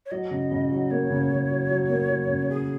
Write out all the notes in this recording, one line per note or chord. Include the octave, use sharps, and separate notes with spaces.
C#5
F#3 D#5
C#3
C#3
F#3
A#3 C#5
C#3
C#3
F#3
F#3
A#3
F#3
C#3
C#4 G#4